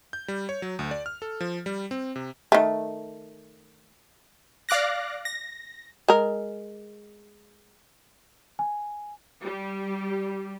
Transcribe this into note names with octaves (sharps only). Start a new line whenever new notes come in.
G6
G3
C#5
F#3
D2
D5
F6
A4
F3
G3
C4
C3
D#3 A3
D5 F5 D6 F#6 A#6
A#6
G#3 A#4
G#5
G3